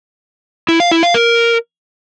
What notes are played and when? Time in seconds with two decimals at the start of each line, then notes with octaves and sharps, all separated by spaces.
0.69 E4
0.80 F5
0.91 E4
1.03 F5
1.14 A#4